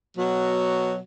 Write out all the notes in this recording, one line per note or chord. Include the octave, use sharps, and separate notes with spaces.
B2 F#3